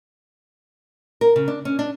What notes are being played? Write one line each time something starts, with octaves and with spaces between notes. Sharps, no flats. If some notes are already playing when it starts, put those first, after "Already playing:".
A#4
C#3
D4
C#4
D4